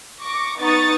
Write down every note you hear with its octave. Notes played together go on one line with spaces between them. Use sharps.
C#6 D6 A#6
B3 D#4 C#6 D#6 A6